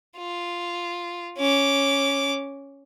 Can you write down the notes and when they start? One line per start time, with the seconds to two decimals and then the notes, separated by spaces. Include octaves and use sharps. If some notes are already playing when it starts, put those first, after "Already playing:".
0.18 F4
1.38 C#4 D6